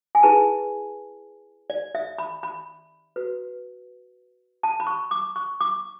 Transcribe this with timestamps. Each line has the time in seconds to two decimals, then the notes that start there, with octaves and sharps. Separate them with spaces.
0.15 G#5
0.23 E4 G#4 B4 A5
1.70 D5
1.95 E5
2.18 B5
2.43 B5
3.16 F#4 B4
4.63 A5
4.80 B5
4.87 C#6
5.11 D6
5.36 C#6
5.61 D6